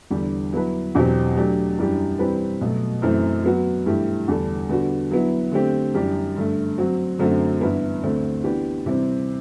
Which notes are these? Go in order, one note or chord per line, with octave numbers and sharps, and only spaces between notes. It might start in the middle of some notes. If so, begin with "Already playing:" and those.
E2 D3 G3
F#3 B3 E4 B4
E2 B2 F#3 C4 G4
F#3 A3 D4 G4
F#2 E3 G3 D4 G4
E3 G3 C4 G4 B4
B2 F#3 A3
F#2 E3 A3 C4
F#3 B3 F#4
G2 E3 A3 E4 G4
E2 D3 G3 D4 A4
D3 G3 B3 F#4
F#3 B3 E4
D3 A3 C4 G4
F#2 E3 G3 D4 G4
G2 D3 A3
F#3 C4 F#4
F#2 D3 A3 C4 F#4
G2 E3 B3 E4
D2 D3 A3 C4
E3 B3 D4 G4
C3 E3 G3 C4